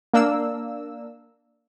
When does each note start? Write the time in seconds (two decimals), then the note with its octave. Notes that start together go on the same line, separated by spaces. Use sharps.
0.13 A#3 D4 E6